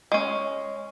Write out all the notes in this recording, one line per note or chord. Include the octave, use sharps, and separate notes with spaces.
G#3 C#4